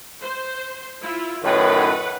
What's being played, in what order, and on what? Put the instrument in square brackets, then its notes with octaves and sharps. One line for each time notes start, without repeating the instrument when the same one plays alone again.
[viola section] C5
E4 F4
[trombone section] F#2 A2 D#3 [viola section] B4 F#5